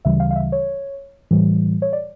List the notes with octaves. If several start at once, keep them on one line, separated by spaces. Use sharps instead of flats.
D2 C#3 E3 G3 E5
F5
F5
E5
C#5
A2 E3 G3
C#5
D5